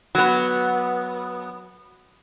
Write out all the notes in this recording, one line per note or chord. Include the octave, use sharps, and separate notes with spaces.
F#3 B3